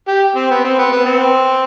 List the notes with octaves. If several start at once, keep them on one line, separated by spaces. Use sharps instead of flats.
G4
C4
B3
C4
B3
B3
C4